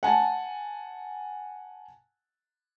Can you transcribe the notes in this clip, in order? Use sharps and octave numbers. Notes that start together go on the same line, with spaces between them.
F#5 G#5 A5